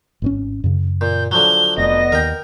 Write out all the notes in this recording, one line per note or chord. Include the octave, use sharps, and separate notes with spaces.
G#1 B2 C#4
F#2 C#3
A#2 G6
D3 F3 F#3 G7
F1 B3 D5 D#5 A#6
D#2 A#4 G5